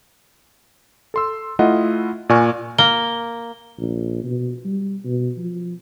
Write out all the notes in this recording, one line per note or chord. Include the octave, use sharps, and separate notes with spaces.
A4 C6 E6
A3 E4 F4 D#5 F#5
A#2 D5 G#5 C#6 F6
A#3 G7
A#1
B2
G3
B2
F3